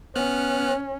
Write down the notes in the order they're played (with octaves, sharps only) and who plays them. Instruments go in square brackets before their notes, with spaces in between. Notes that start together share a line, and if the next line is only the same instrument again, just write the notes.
[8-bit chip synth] B3 F6 F#6 [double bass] C#4